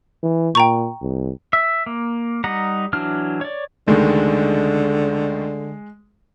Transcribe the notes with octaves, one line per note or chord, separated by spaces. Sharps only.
E3
A#2 G5 A#5 C#6
C2
E5
A#3
G3 D#4 F#5 A#5
E3 F#3 D4 F6
C#5 D5
C#2 D3 D#3 G#3 A3